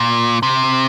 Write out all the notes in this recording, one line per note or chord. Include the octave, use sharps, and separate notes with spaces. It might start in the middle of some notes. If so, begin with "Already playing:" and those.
Already playing: A#2
C3